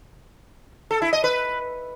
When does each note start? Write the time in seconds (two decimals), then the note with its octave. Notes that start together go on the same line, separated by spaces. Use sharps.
0.91 A4
1.02 E4
1.13 D#5
1.24 B4